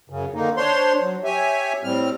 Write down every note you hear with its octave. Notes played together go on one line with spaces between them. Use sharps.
F#2 C#3
D3 D#3 A#3 D#4
D4 C5 C#5 C6
F#3
G4 C#5 E5 G#5
A2 G3 C4 F6